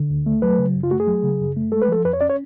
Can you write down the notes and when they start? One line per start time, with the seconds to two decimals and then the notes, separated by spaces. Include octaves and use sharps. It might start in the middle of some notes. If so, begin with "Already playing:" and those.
Already playing: D3
0.10 D2
0.26 A3
0.42 F#3 B4
0.58 C#3
0.75 F#2
0.83 F4
0.91 A3 F#4
1.00 G#4
1.07 F#3
1.23 C#3
1.40 F#2
1.56 A3
1.72 G#3 A4
1.82 B4
1.88 F3 A4
2.05 F2 B4
2.13 C#5
2.21 C#4 D5
2.29 C#5